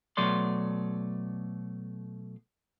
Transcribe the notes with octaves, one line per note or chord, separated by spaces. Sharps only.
B2 F#3 A3 D5 C6